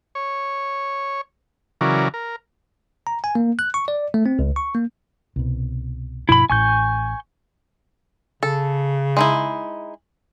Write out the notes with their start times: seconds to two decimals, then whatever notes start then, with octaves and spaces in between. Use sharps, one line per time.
0.15 C#5
1.81 C#3 E3 F#3 A#4 D5
2.14 A#4
3.07 A#5
3.24 G#5
3.35 A#3
3.59 F#6
3.74 C#6
3.88 D5
4.14 A3
4.26 C4
4.39 C#2
4.56 C#6
4.75 A#3
5.36 C2 B2
6.29 G2 B2 F3 E4 B5
6.50 A1 A2 G#5 C#6 G6
8.43 C#3 A4
9.17 G#3 D#4 E4